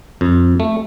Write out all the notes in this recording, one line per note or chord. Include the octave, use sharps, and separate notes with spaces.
F2
A3